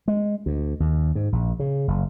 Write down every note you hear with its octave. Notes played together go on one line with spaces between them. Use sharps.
G#3
D2
D#2
G#2
A#1
C#3
F#1